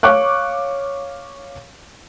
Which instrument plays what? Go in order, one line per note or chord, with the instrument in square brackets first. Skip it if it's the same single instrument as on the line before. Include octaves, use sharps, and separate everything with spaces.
[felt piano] C#5 F5 C#6 D6 F#6